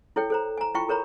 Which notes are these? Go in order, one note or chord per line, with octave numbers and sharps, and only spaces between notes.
E4 A4 C#5 G5
A4 C5 A#5
G#5 A#5
E4 F4 G5 C#6
A4 A#4 C#5 A#5 B5